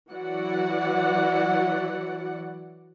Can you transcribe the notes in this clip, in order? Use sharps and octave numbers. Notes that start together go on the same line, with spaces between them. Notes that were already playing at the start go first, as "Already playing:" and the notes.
E3 F#3 F#4 D5 F#5